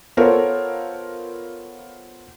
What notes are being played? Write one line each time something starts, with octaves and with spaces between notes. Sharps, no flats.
B3 F4 A4 A#4 C5 C#5